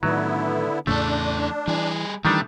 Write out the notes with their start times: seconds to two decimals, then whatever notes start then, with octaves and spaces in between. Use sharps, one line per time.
0.03 A2 D3 D#3 F#3 B3 E4
0.87 E2 A2 C#3 E3 A3 D4 A4
1.68 E3 G3 G#4
2.25 D#3 E3 G3 A3 D4